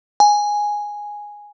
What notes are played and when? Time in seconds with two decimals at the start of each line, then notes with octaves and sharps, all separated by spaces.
0.20 G#5